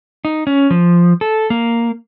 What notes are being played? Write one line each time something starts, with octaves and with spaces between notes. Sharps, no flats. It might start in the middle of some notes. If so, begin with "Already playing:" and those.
D#4
C#4
F3
A4
A#3